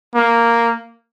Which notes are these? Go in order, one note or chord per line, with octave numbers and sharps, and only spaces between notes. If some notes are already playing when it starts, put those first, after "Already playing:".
A#3